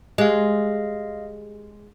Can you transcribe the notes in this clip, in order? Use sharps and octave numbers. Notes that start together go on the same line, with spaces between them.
G#3 G4 G#4 D#5 F5